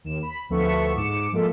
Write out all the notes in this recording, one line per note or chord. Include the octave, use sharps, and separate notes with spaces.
D#2 E7
B5
D2 F3 B3 A4 E5 C#6
G#2 D6 C#7 E7
F3 G#3 A#3 F4 A4 E5